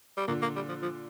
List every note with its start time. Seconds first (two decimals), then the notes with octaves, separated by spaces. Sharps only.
0.17 G3
0.28 A#2 D3 A#3
0.42 A#3
0.56 G3
0.68 F3
0.82 F3